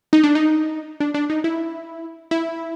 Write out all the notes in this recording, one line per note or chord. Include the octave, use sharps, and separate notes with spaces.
D#4
D4
D#4
D4
D4
D#4
E4
E4